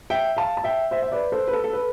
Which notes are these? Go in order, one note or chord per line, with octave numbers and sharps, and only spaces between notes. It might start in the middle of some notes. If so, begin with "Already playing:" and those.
E5 G5
F5 A5
A5
E5 G5
C5 E5
E5
B4 D5
A4 C5
B4
A4
A4
B4